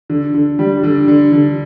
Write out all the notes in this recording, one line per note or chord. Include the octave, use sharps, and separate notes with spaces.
D3
D3
G3
D3
D3
D3